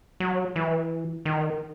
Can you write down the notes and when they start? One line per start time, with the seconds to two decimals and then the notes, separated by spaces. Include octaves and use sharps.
0.20 F#3
0.56 E3
1.25 D#3